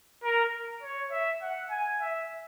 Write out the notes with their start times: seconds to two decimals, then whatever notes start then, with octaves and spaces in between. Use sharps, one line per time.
0.23 A#4
0.82 C#5
1.12 E5
1.42 F#5
1.71 G#5
2.01 E5